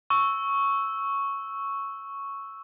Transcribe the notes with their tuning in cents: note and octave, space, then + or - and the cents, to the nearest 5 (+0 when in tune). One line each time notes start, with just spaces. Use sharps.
C#6 +0 E6 +0